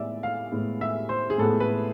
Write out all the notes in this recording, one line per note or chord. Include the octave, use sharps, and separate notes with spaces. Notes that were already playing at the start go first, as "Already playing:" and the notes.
Already playing: A2 G#3 B3 D5 E5
F5
A2 G#3 B3
E5
C5
G#4
A2 G#3 B3 A4
B4